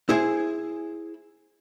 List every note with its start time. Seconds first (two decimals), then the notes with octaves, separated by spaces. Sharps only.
0.09 E4 G#4 C5